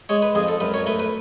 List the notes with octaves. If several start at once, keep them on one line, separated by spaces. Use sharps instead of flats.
G#3 C#5
B4
F2 G#4
A4
F#2 B4
C#5
A3 B4
B4